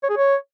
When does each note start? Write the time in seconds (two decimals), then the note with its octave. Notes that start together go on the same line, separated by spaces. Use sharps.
0.03 C#5
0.10 G#4
0.16 C#5